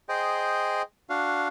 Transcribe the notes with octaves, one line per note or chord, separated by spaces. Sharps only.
G#4 C5 D#5 G5
D4 F#4 F5